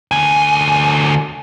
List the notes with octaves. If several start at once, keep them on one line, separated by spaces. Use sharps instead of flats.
D2 G#5